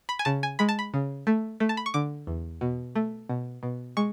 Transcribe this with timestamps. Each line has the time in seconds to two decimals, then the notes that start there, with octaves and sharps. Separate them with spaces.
0.09 B5
0.19 G#5
0.25 C#3 A5
0.43 G#5
0.59 G#3 B5
0.69 A5
0.79 B5
0.94 C#3
1.27 A3
1.60 A3
1.69 A5
1.77 B5
1.86 C#6
1.94 D3 D6
2.27 E2
2.61 B2
2.95 A3
3.29 B2
3.63 B2
3.97 G#3 C#6